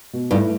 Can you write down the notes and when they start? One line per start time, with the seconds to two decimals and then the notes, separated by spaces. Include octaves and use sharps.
0.13 B2
0.31 G2 A3 E4 B4